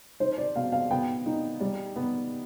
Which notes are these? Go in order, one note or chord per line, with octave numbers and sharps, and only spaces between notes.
D#4 C5
D5
B2 F5
F5
B3 G5
D#4
G3
B3